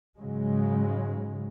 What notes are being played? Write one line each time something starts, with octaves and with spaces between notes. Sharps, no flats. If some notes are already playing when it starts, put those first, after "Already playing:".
G#2 C#3 F#3 G#3